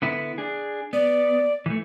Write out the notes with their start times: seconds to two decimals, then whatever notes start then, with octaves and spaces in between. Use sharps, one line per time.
0.02 D3 B3 E4
0.38 D4 G#4
0.93 B3 D5
1.66 E3 A3